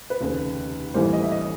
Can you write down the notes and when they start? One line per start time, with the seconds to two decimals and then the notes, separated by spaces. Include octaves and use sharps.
0.10 B4
0.20 F1 D#2 C#3
0.94 A1 A2 E3 G3 A#3 C5
1.13 D#5
1.22 E5
1.32 D#5